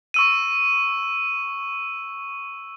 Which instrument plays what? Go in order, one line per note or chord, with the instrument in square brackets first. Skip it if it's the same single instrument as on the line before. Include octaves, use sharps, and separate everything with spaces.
[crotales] C#6 E6 D#7